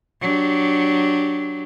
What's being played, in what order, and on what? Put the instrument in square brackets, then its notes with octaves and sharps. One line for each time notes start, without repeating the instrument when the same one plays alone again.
[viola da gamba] F#3 D4 G4